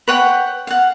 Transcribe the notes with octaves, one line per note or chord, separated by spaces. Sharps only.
B4 C#5 F#5 G5
F5 F#5